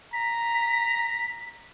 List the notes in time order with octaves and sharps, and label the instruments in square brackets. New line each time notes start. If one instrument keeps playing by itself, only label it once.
[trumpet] A#5 [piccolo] B6